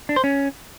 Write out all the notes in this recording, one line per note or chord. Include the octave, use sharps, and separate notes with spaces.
D4
C5
C#4